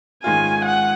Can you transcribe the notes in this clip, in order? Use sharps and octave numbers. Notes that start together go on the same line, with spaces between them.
G#2 D#3 G#3 C#4 F4 G#5
F#5